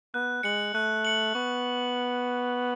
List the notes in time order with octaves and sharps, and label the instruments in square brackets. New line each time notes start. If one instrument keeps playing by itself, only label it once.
[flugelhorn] B3 [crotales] F#6
[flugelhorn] G#3 [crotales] C#7 F#7
[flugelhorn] A3 [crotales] F#6
[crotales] C#7 F#7
[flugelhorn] B3 [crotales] C#6